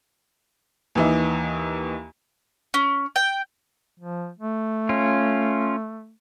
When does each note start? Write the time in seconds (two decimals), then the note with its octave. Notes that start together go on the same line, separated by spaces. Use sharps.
0.95 D#2 E3 D#4
2.74 C#4
3.16 G5
3.99 F3
4.39 A3
4.89 C#4 F4